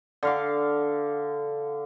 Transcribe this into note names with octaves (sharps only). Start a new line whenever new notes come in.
D3 F5 D6